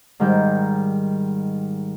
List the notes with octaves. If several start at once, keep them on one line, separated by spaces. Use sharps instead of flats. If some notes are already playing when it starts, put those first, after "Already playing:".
G#2 D#3 G3 G6